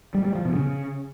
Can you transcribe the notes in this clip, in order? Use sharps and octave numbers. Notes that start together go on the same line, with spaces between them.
G3
G3
F3
B2
C#3